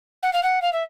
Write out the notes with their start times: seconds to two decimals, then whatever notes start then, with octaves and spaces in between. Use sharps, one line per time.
0.23 F#5
0.33 F5
0.43 F#5
0.62 F5
0.73 E5